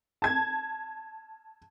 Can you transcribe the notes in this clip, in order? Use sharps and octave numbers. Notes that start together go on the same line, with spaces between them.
A5 G#6